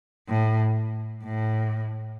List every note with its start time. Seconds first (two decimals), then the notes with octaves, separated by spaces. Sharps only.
0.28 A2
1.24 A2